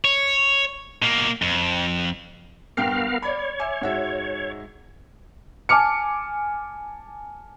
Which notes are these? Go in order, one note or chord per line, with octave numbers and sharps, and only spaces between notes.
C#5
B2 A#3
F2
G2 B3 A#4 F5 G5 C7
C#5 D5 B5
E5 G#5 D6
G#2 F#4 E5
G#5 A5 D6 F6 C#7